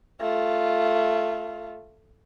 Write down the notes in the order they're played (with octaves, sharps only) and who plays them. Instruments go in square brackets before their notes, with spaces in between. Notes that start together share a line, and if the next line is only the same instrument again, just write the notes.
[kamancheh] A3 F4